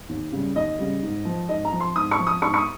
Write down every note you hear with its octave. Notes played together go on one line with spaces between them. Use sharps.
D#2
C#3 G3
D#2 D#5
C#3 G3
G#2
F3
G#2 D#5
A#5
F3
C6
G#2 D#6
C#6
F3
D#6
G#2 C#6
C#6
D#6